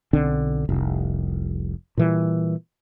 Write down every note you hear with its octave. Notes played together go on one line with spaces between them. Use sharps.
B1 D3 C4 D4
F1 C2
A#2 E3 G3